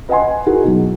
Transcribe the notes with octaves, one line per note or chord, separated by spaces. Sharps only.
B4 D#5 F#5 G#5 C6
D#4 E4 F#4 G#4 A#4
B2 F#3